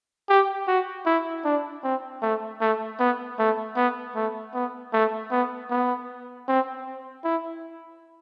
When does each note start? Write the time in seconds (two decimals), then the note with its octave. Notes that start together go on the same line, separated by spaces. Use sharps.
0.29 G4
0.67 F#4
1.06 E4
1.45 D4
1.84 C4
2.22 A3
2.61 A3
3.00 B3
3.39 A3
3.76 B3
4.15 A3
4.54 B3
4.93 A3
5.31 B3
5.70 B3
6.48 C4
7.24 E4